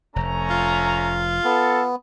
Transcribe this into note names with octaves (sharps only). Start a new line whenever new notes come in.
F1 A3 C#4 A#5
F4
B3 A4